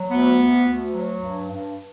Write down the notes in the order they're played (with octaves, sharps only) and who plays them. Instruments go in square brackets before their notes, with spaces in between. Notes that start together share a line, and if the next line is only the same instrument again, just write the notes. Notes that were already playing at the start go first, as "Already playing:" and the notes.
Already playing: [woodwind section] F#3
D2 B3
D2
D2
F#3
G2
G2